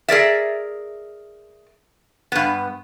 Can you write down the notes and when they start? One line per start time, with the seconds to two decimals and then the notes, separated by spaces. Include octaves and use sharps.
0.08 G#4 A#4 D5 E5
2.32 G2 B3